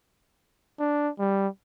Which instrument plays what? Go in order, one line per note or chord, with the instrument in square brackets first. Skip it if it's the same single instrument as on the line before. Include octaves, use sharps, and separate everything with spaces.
[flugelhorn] D4
G3